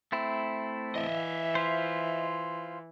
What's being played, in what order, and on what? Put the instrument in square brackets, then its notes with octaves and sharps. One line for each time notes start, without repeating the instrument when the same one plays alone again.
[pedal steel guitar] A3 C4 E4
[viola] E3 [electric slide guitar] D#5 E5
[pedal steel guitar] F4 C5